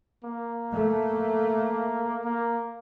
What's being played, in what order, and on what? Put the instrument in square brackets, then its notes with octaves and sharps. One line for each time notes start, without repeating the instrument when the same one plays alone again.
[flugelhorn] A#3
[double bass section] A3
[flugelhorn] A#3